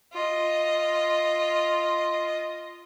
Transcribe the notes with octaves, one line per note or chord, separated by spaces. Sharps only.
F4 D#5